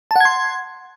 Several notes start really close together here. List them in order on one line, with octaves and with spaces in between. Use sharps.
A5 F#5 G#6 C6